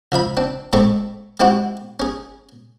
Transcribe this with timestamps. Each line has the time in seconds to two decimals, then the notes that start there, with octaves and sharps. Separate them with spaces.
0.12 C#2 F3 E5 B5
0.37 C4 D4
0.73 A2 G#3 A3 C4 E5 C#6
1.40 G#3 C4 E4 F#4 G4
2.00 C#4 G#4